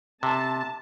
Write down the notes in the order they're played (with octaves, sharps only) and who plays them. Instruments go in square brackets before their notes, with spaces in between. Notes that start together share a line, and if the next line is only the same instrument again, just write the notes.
[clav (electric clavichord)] C3 [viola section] A5